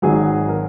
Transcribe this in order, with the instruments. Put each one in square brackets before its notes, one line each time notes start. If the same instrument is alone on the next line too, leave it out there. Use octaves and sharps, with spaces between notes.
[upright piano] G#1 G#2 D#3 F#3 G#4
A#4